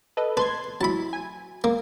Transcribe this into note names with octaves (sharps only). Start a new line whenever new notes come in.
A4 B4 D#5
B4 A5 C6 G#6
F#3 E4 A5 B5
G#5
A#3